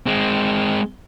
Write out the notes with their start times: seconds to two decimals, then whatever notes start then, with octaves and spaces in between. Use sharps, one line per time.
0.06 G#3 C4